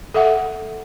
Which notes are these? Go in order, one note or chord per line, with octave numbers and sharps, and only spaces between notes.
A4 E5 F#5